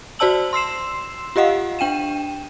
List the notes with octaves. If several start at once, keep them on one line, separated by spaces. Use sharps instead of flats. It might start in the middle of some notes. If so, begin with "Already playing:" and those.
F#4 C5 D5 A5 E6 F#7
C6 E6 C7 E7
F4 G4 D#5 F5 F#5
D4 G5 D#7 E7